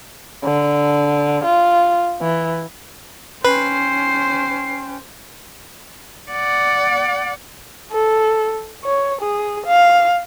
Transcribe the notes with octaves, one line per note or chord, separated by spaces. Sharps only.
D3
F4
E3
C#4 B4 C5 G5 C7
D5 F#5
A4
C#5
G#4
F5